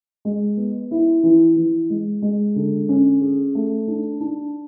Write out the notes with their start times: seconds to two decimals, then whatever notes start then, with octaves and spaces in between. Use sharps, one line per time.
0.25 G#3
0.57 B3
0.91 E4
1.23 E3
1.56 E3
1.90 G#3
2.22 G#3
2.56 D3
2.89 C#4
3.21 G#4
3.55 A3
3.88 D4
4.20 D4